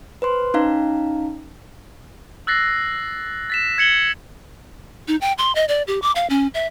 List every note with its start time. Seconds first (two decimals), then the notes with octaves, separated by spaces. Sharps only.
0.22 B4 C5 C6
0.54 C#4 D#4 F5 A#5
2.47 E6 F#6 A6 A#6 C7
3.50 A6 B6 E7
3.78 G#6 C#7 F#7 G7
5.08 D#4
5.21 G5
5.38 C6
5.55 D#5
5.68 D5
5.87 G4
6.02 D6
6.15 F5
6.30 C#4
6.54 E5